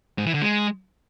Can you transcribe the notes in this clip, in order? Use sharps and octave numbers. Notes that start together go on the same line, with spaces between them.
G#2
E3
D3
G#3